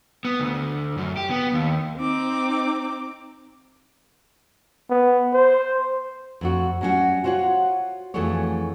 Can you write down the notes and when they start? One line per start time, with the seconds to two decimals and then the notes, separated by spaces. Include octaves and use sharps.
0.25 B3
0.40 D2
0.98 F#2
1.17 G4
1.30 B3
1.53 D#2
1.97 C4 D#4 D6
4.90 B3
5.33 C5
6.41 F2 C4 F#4
6.81 F#3 G3 C#4 D4 F#4
7.24 F4 F#4 C5 C#5 F#5
8.14 F2 E3 A3 F#4 G#4 C#5